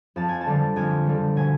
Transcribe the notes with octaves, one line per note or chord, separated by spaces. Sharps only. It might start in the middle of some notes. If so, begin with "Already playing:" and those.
F2 A5
G#5
A5
D3 G3
F2 G#5
D3 G3
B2 G#5